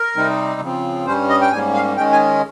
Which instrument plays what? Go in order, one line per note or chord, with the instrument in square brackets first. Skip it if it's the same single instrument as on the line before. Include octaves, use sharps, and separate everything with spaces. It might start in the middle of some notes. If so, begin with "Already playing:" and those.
Already playing: [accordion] A#4
C3 G3 C4 D#4
C#3 F3 C4
G2 G3 C#4 C5
D#5
G5
G#2 G3 A#3 C#4 G#5
F5
D#3 G#3 C#4 G5
G#5